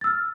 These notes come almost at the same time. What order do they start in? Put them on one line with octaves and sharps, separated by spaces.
A6 E6 F6